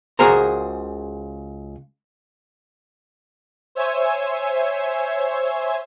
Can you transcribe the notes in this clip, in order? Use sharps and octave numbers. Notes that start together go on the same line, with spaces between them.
C#2 F#4 G#4 A#4 C5 A#5
C5 C#5 E5 G#5 E6 G#6